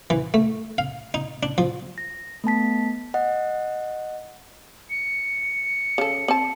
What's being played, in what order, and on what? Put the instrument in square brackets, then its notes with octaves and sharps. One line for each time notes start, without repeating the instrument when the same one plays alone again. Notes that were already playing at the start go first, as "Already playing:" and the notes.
[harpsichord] E3
A3
F5
D#4
D4
F3
[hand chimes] A#6
A3 B3 A5 B6
D#5 F#5
[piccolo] C#7
[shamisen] C#3 A4
C4 A5